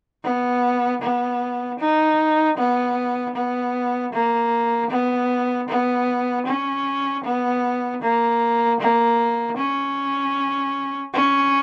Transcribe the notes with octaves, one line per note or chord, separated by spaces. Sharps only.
B3
B3
D#4
B3
B3
A#3
B3
B3
C#4
B3
A#3
A#3
C#4
C#4